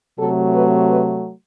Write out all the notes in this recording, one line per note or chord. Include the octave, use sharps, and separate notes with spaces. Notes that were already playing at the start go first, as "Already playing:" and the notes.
C3 F#3 A3 A4
B4
B4